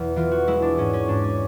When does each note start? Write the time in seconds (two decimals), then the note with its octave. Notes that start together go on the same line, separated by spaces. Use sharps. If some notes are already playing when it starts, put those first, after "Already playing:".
Already playing: E2 B2
0.16 E3 F4
0.31 F#4
0.47 G#3 E4
0.62 D4
0.78 G#2 C#4
0.93 C#4
1.08 G#2 D4
1.24 C#4